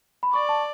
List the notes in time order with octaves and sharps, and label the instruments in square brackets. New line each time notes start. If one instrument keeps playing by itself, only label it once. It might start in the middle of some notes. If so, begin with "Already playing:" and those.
[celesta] B5
[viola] D5 [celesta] C#6
[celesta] A5